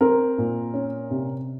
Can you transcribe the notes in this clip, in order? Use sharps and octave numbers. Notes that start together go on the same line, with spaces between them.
C4 A#4
A#2
C#4
C3